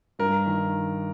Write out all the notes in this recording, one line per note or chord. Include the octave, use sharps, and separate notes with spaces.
G2 A#4
D#3